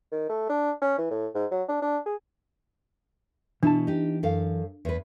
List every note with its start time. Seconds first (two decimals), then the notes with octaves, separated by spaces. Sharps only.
0.12 D#3
0.29 A3
0.49 D4
0.82 C#4
0.98 E3
1.10 A2
1.35 G#2
1.51 F#3
1.69 D4
1.82 D4
2.06 G#4
3.63 B2 E3 D4 E4 A5
3.87 D#4 G4
4.23 F#2 A4 F5
4.85 E2 B4